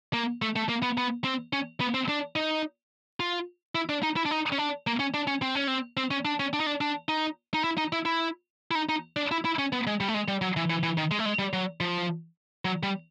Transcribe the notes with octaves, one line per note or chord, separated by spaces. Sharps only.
A#3
A3
A3
A#3
B3
B3
C4
C#4
B3
C4
D4
D#4
F4
E4
D4
D#4
E4
D4
D#4
C#4
D4
A#3
C#4
D4
C#4
C4
C#4
C4
C4
C#4
D4
C#4
D4
D#4
D4
D4
D#4
D#4
E4
D#4
E4
E4
E4
D#4
D#4
D4
E4
E4
C#4
B3
G#3
G3
A3
G#3
G3
F#3
E3
E3
E3
D#3
G#3
A3
G#3
G3
F#3
F3
F#3
G3